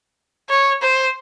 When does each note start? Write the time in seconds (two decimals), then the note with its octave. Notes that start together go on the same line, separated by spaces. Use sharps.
0.50 C#5
0.82 C5